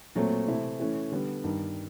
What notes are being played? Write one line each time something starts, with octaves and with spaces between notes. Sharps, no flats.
A#2 F#3 A3 C4
C3 E3 A3 C4 E4
E3 A3 C#4
D3 G3 B3
G2 D#3 G3